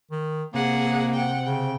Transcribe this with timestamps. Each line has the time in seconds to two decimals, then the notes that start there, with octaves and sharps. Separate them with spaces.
0.11 D#3
0.54 C3 A#3 G#4 F#5
1.14 F#5 G5
1.45 C#3 G5